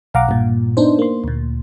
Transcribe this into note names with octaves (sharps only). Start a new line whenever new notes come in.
B1 F5 F#5 A#5 D6
G2 A#2
B3 D4 D#4 C5
A#3 C6
D2 A#2